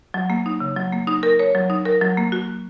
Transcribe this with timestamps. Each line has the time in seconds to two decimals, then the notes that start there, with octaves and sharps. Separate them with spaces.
0.14 F#3
0.30 A#3
0.46 D#4
0.60 C#3
0.77 F#3
0.93 A#3
1.07 D#4
1.23 A#4
1.39 C#5
1.55 F#3
1.70 D#4
1.85 A#4
2.01 F#3
2.17 A#3
2.32 F#4